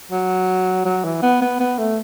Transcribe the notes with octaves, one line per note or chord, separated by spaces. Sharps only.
F#3
F#3
E3
B3
B3
B3
A3